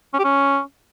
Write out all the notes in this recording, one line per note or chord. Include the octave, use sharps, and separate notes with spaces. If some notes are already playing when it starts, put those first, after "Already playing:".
C#4
G4
C#4